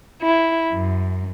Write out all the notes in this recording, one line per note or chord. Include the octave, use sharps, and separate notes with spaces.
E4
F#2